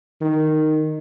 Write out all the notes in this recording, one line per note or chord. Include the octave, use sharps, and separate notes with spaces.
D#3